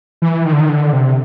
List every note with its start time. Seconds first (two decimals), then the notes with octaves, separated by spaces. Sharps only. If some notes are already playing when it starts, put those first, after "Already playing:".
0.22 E3
0.45 D#3
0.53 D3
0.60 D#3
0.69 D3
0.93 C3